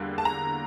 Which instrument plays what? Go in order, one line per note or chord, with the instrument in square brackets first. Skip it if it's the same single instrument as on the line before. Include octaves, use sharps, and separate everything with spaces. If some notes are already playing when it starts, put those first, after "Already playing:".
Already playing: [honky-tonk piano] E2 D3 G3 A#3
A5
A#5